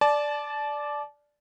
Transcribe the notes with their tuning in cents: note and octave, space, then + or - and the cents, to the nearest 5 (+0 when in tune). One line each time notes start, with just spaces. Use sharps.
D5 +0 A5 -30